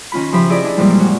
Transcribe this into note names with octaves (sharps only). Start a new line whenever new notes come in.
D#3 C#4 F4 B5
C#3 F3 G4 E5 B5
E4 G#4 D5 D#5
D4 E4
F#2 A#2 E3 F3 G3 G#3
F#4 C#5